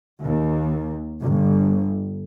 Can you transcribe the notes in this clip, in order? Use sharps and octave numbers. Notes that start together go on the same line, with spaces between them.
D#2
G1